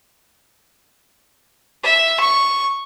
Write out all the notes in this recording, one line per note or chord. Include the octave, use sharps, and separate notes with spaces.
E5
C#6